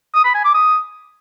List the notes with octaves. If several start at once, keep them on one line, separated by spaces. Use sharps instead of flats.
D#6
B5
G#5
D6
D#6